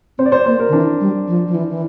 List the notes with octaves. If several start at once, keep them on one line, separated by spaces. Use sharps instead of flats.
C4 C5
D5
C5
A#3 C5
A#4
D3
E3 D4
G3
F3
F3
E3
E3